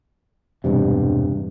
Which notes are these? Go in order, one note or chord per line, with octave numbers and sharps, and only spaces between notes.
E1 G2 C3